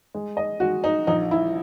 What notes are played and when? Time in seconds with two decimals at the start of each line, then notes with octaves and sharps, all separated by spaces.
0.15 G#3
0.37 D#5
0.60 G#3 F#4
0.84 D#4
1.07 A#1 D#4
1.31 E4